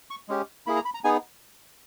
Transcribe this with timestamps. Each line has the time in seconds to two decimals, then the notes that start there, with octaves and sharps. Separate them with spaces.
0.10 C#6
0.29 G#3 C#4 G4
0.67 A#3 E4 G#4 B5
0.76 A#5
0.85 B5
0.94 A#5
1.04 B3 D#4 G#4 G#5